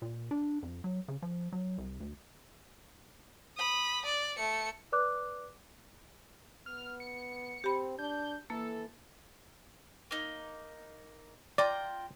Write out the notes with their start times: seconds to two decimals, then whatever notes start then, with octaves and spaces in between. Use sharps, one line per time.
0.02 A#2
0.31 D4
0.63 F2
0.84 F#3
1.08 C#3
1.22 F3
1.53 F#3
1.78 C2
2.00 D2
3.57 B5 D#6
4.05 D5
4.37 A3 C#7
4.92 B4 D5 D6 F#6
6.66 B3 F6
7.00 C#7
7.64 C4 G4 B5
7.99 D4 G6
8.50 E3 A#3 A4
10.11 A#3 D#4
11.58 F4 D5 G5 A#5